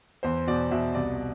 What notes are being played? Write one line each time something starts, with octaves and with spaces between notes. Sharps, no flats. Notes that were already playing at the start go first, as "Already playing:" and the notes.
E2 C5
B2 D5
B2 E5
C2 D5